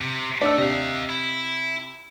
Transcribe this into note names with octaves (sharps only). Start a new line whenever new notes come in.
C3
A3 D4 E6
C3 D#5 F5
E4